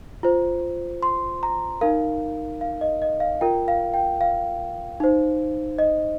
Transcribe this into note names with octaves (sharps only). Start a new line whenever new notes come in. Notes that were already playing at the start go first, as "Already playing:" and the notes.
F4 C5
C6
A#5
D#4 A#4 F5
F5
D#5
D#5
F5
F4 A#4 G5
F5
G5
F5
D#4 C5
D#5